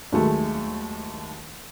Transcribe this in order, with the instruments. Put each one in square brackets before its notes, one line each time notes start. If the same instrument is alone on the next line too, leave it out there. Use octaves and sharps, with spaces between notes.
[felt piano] D#2 F#3 G#3 A3